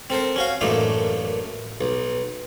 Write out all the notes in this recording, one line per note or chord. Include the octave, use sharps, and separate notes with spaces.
C4 A4 A#4 C5
C#4 F#4 F5
A1 F#2 A3 A#3 D4 D#4
B1